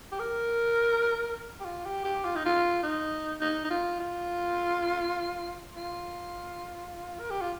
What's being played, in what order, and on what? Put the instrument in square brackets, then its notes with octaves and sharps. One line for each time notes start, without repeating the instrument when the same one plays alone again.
[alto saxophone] G4
A#4
G4
F4
G4
G4
F4
D#4
F4
D#4
D#4
D#4
F4
F4
F4
A#4
G4
F4